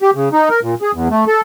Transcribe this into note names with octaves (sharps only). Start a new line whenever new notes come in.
G4
C#3
D#4
A#4
A#2
G#4
E2
A3
A4